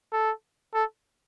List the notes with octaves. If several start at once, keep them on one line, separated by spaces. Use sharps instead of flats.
A4
A4